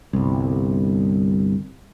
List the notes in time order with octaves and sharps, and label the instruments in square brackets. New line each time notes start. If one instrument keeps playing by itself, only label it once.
[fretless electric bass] G1 C2